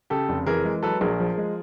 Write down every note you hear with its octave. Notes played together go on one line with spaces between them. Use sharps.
C#3 G4 A4
F1
E3 G#4 A#4
G#3
F#3 A4 B4
A#1 G#4 A#4
F3
G#3